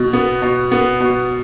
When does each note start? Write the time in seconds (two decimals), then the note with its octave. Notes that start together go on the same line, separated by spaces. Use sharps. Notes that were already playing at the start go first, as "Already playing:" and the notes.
Already playing: B2
0.13 B3
0.42 B2
0.71 B3
1.00 B2